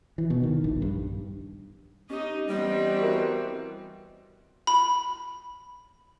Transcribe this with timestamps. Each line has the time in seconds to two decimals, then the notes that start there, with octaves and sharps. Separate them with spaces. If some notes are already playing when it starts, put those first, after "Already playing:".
0.18 E3
0.30 B2
0.43 D#3
0.64 A#1
0.82 G2
2.10 C#4 D#4 G4 D#5
2.49 E3 G3 B3 C4 D#5
2.97 E4 F#4 A#4
4.67 B5